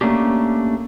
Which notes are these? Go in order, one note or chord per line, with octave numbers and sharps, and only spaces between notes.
A3 A#3 C#4 D4 G4